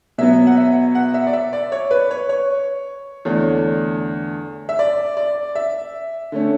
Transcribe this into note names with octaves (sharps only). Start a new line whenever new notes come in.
B2 F#3 B3 E5
F#5
E5
F#5
E5
D5
E5
D5
C#5
B4
C#5
C#5
E2 D3 A3 D4 C#5
E5
D5
D5
E5
D3 A3 C#4